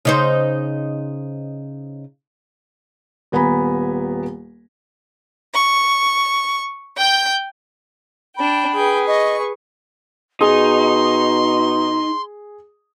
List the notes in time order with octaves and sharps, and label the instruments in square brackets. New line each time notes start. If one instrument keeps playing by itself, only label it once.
[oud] C#3 D#4 C5
[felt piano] D#1 B3 G#5 A#5 B5
[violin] C#6
G5 G6
[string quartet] D4 G5 [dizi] B5
[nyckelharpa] G#4 B4 [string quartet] G5
[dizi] D#5 [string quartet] C#6
[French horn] B2 [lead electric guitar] D#4 [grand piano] G#4 D#6 [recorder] C6